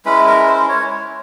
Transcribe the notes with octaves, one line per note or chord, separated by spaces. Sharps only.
G#3 C#4 E4 B4
A#4
C5
C#5